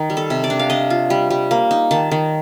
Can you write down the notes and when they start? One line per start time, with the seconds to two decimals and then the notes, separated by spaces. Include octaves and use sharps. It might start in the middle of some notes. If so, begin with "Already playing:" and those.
Already playing: D#3
0.10 G3
0.17 A4
0.30 C3
0.44 D5
0.50 D4
0.59 F5
0.70 D4 D#5
0.90 F4
1.10 G3
1.30 G3
1.51 A#3
1.71 D#4
1.91 D#3 A5
2.12 D#3